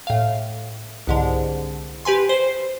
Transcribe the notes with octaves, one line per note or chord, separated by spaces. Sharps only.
A2 F5
C2 G#2 D3
G4 B4 G#5 C6
C5 C7